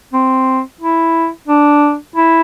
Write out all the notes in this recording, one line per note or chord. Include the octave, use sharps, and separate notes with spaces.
C4
E4
D4
E4